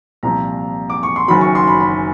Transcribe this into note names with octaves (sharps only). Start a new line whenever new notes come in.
C2 A#2 F3 A#5
D6
C#6
C6
F#1 F#2 D#3 F#3 B5
C#6
C6
B5
B5